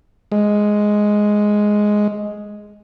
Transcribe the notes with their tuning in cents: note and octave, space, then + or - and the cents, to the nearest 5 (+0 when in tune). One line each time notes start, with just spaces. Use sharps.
G#3 +5